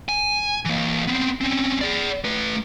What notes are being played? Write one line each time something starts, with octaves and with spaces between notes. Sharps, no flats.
G#5
E3 A#3
B3 C4
C4 C#4
G#4 D5
A3 B4